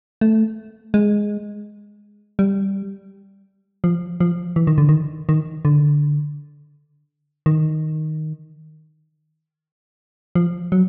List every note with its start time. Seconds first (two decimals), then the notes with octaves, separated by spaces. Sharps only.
0.21 A3
0.94 G#3
2.39 G3
3.84 F3
4.20 F3
4.56 E3
4.67 D#3
4.78 D3
4.89 D#3
5.29 D#3
5.65 D3
7.46 D#3
10.35 F3
10.72 F#3